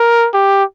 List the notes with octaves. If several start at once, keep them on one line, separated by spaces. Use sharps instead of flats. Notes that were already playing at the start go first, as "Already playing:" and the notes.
Already playing: A#4
G4